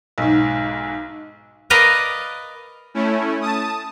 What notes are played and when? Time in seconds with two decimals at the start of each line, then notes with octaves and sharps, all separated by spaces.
0.18 B1 G#2
1.70 A#4 B4 D5 D#5 F5
2.94 A3 C#4 E4
3.41 A5 D#6